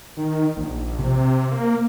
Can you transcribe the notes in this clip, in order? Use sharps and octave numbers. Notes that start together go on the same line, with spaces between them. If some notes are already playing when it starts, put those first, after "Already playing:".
D#3
A#1
C3
A#3